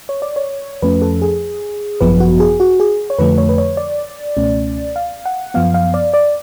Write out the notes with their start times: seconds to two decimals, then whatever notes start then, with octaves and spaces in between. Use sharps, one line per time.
0.09 C#5
0.22 D5
0.36 C#5
0.82 F2 F3 A3 C#4 B4
1.02 A4
1.22 G#4
2.00 G#1 F#2 F3 B3 B4
2.20 F#4
2.40 G#4
2.60 F#4
2.80 G#4
3.10 C#5
3.19 F2 D3 F3 A3 B4
3.38 C#5
3.49 B4
3.58 C#5
3.77 D5
4.37 C#2 B2 A3 C#4
4.96 F5
5.25 F#5
5.54 F#2 F3 B3 F5
5.74 F5
5.94 D5
6.14 D5